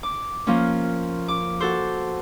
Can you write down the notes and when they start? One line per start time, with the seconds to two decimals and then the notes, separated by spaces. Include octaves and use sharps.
0.03 D6
0.47 F3 A#3 C#4
1.28 D6
1.60 F#4 A4 C5